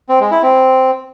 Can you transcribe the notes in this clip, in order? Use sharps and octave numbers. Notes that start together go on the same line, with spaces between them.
C4
G#3
E4
C4